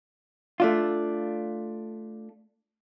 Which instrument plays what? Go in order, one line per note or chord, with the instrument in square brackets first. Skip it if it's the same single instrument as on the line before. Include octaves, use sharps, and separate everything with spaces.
[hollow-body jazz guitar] A3 D4 F4